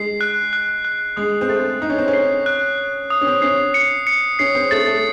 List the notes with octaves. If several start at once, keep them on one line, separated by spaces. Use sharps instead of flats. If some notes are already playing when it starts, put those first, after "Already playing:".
Already playing: G#3 C7
F#6
F#6
F#6
G#3 D#6
C4
A3 A6
D#4 C7
C#4
C4
C#4
C7
F#6
F#6
D#6
C#4
C4
C#4 C7
C#7
C#7
C#4 C7
C4
A3 A6
A3